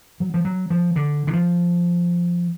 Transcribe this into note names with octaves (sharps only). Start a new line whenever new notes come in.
F#3
F3
F#3
F3
D3
D3
F3